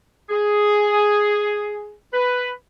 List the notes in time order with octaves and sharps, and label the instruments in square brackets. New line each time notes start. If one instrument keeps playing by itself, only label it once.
[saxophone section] G#4
B4